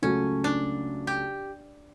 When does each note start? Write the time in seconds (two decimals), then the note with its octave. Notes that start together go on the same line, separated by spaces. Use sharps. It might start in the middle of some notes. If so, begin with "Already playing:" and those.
0.02 C#2 C#3 F#3 A3 C#4
0.44 D4
1.07 G4